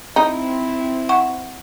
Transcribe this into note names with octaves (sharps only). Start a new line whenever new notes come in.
C4 D#4 E4
F#5 C#6